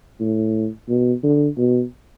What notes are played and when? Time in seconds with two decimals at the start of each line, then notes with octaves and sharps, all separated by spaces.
0.20 A2
0.89 B2
1.23 D3
1.58 B2